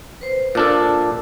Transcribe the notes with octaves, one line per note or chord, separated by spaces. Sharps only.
B4 C5
A#2 D4 A4 D6